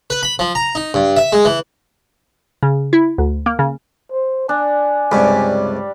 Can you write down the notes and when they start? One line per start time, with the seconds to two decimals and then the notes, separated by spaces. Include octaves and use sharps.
0.10 B4
0.23 B5
0.39 F3
0.55 A#5
0.75 D#4
0.94 G2
1.17 E5
1.33 G#3
1.45 E3
2.63 C#3
2.93 E4
3.18 D2
3.46 A#3
3.59 C#3
4.12 C5
4.49 D4 G#5
5.12 C#2 G2 C3 G3